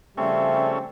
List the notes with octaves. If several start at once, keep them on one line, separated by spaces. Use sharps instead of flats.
C#3 F3 G3 A3 C4 C#4 E5